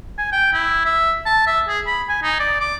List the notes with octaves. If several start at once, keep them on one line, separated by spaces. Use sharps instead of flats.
G#5
G5
E4
E5
A5
E5
G#4
B5
G#5
D#4
D5
D6